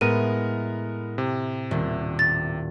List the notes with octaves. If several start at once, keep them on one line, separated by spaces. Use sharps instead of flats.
A2 G#3 B3 A#4 D#7
C3
D#1
A6